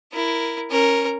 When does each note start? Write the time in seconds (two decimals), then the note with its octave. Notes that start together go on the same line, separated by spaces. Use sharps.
0.13 E4 A#4
0.70 C#4 A#4